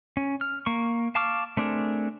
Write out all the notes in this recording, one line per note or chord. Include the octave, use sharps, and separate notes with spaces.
C#4
F6
A#3 C#6
F5 A5 C#6 D6 F6
A3 C4 D4 G#4 A#4